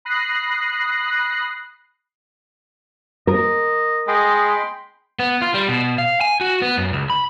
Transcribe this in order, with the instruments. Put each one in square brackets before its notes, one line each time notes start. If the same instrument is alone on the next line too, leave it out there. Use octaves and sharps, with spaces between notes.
[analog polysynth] B5 D#6 F#6 A#6 C7
[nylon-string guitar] A#4 [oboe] D#5
[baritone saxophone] G#3 [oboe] D#5 [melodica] G5 B5 C6
[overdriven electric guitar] B3
F4
G3
B2
F5
G#5
F#4
B3
F#2
C#2
B5